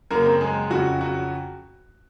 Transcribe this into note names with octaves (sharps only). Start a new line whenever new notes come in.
F#2 C#3 F#3 A#3 A#4
C4 C5
G#3 G#4
F2 C#3 F#3 F#4
F#3 F#4